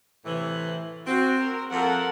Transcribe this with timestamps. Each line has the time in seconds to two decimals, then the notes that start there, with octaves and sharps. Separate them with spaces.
0.24 A2 C3 E3
1.06 C4 F#4
1.40 A#4
1.71 F2 C4 A4 A#4 F#5